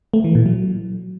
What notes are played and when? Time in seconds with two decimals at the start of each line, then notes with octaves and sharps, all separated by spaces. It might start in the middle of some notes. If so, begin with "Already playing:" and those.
0.14 A3
0.24 E3
0.35 A#2
0.46 F#3